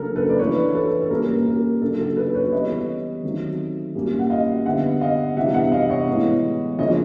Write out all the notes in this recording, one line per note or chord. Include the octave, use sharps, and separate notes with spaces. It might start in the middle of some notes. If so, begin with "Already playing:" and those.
Already playing: C#3 F#3 A#3 D4 A4 A#4
A4 B4
D5
E3 A3 D4 B4 C#5
A4 B4
A4
A#2 G3 A#3 C#4 A#4
A#4
C#3 F#3 A#3 D4 A4
A4
A4 B4
B4 C#5
E3 G3 B3 C#5 D#5
D#3 F#3 A3 C4
A#2 G3 A#3 C#4
F#5
D#5 F5
D3 G3 B3 E5 F#5
D#5 F5
C3 E3 G3 B3 D4 E5 F#5
E5 F#5
D#5 F5
C#5 D#5
A2 E3 G#3 B3
C#3 F3 A#3 D4 C#5 D#5